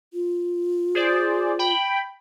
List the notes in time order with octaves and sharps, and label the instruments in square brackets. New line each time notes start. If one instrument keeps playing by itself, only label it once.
[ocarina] F4
[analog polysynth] G#4 C5 D5
G5 B5